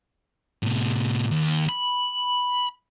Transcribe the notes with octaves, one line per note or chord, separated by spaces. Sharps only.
A2 C3
D#2
B5